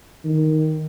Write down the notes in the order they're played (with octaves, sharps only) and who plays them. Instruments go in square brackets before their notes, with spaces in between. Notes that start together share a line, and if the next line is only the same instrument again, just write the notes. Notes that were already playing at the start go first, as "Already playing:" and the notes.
[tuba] D#3